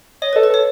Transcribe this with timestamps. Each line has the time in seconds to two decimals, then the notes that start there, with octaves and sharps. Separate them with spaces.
0.22 C#5 D#5
0.33 B4
0.36 A4
0.43 B4
0.50 A4 C#5